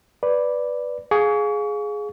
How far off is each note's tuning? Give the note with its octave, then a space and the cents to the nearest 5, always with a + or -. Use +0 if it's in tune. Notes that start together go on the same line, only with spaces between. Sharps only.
B4 +0 D5 +0
G#4 +10 F5 +20 C#6 +35